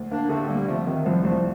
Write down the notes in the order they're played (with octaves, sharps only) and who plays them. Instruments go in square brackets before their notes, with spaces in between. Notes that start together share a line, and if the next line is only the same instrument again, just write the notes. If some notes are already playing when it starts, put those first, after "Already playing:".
Already playing: [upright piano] D2
[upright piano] D2 [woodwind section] A#3 D4
[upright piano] D3 [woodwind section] A3 C4
[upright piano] D2 [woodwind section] G3 A#3
[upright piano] C3 [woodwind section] F3 A3
[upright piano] C3 [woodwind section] D#3
[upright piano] C2 [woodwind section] F3
[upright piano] C2 [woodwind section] F3 A3